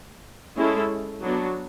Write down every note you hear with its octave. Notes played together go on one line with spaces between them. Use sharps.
G#3 C#4 E4 A4
F#3 B3 D4 F#4